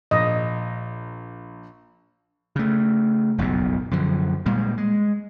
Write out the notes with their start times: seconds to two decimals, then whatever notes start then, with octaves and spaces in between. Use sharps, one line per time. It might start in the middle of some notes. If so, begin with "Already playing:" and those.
0.11 A#1 D#5
2.56 C#3 A3
3.38 F#1 B1 F2 B2
3.91 F#2 D3 F3
4.46 A#2 G3 G#3
4.78 G#3